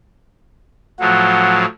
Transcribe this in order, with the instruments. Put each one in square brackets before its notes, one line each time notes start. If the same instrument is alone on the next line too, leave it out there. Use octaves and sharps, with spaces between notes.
[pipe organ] A2 F3 F#3 [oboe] F#5